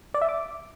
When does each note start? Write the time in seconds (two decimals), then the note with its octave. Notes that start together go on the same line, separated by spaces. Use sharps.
0.14 D5
0.22 E5
0.29 D6